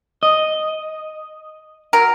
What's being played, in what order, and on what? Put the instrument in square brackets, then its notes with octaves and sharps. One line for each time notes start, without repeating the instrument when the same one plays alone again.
[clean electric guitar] D#5
[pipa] F#3 A#4